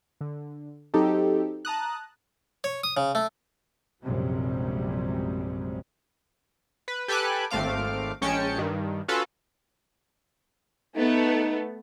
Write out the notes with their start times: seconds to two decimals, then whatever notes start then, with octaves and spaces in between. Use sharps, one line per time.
0.21 D3
0.94 F#3 C4 D#4 G4 A4
1.65 A5 A#5 D#6 F#6
2.64 C#5
2.84 D#6
2.97 C#3
3.15 A3
4.03 A#1 F#2 C3 G3 G#3
6.88 B4
7.08 G4 A4 B4 G#5 D6 F#6
7.50 G#1 A3 C4 F5 D6
8.21 A#1 G#3 C#4 G5 A5 C#7
8.58 G2 D#3
9.08 C#4 F4 F#4 A4 B4
10.96 A3 B3 D#4